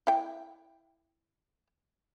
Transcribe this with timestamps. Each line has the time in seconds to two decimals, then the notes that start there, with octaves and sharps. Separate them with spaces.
0.07 E4 G5